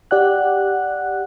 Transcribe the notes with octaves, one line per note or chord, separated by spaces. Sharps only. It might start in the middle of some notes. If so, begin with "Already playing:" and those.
G4 D5 F#5 F#6